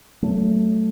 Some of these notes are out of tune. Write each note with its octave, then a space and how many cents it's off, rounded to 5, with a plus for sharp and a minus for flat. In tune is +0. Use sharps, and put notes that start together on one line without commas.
F#3 +30 A3 +0